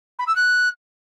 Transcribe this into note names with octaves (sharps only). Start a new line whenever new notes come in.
B5
E6
F#6